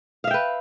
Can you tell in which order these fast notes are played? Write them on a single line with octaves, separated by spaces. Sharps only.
F5 E5 G5 B4